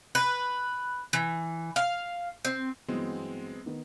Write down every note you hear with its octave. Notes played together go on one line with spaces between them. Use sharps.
B4
E3
F5
C4
G1 E3 F#3 G#3 B3 C4
D#3 B3 D#4